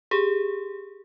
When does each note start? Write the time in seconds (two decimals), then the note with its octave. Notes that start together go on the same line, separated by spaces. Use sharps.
0.11 G4 G#4